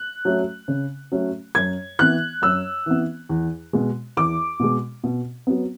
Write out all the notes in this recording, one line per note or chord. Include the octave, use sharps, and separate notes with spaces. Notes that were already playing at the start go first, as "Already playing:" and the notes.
Already playing: F#6
F#3 A3 C#4
C#3
F#3 A3 C#4
F#2 G#6
E3 B3 F#6
F#2 E6
E3 B3
E2
B2 G#3
E2 D6
B2 G#3
B2
F#3 B3